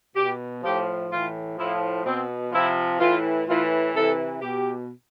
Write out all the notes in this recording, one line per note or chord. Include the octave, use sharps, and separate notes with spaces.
B2 G4
A2 F3 G4
A2 E3 F4
A2 F3 E4
B2 C4
C3 F3 E4
A2 E3 F4
A2 E3 F4
C3 E3 A4
B2 G4